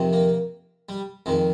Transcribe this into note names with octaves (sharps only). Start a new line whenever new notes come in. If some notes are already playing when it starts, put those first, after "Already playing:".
Already playing: F2 C3 D#3
A#3
G3
F2 D#3 G#3